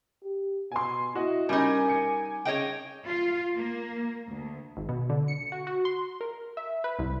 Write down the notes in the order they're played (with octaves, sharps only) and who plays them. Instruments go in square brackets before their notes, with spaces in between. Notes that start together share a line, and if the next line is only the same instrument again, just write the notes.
[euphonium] G4
[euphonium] B2 [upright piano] G#5 C6
[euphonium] E4 [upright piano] F#4 D#5
[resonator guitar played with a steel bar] G3 D#4 [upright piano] C#4 [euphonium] A#4 [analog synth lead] G#5
[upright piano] D6 C#7
[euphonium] C#3 [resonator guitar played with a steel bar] C#5 D#5 G5
[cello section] F4
A#3
D2
[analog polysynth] G#1
B2
D3
C#7
F#4
F#4
C6
A#4
E5
B4
C2